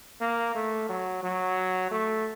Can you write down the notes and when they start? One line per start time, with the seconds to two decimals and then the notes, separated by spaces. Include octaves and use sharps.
0.21 A#3
0.55 A3
0.89 F#3
1.23 F#3
1.92 A3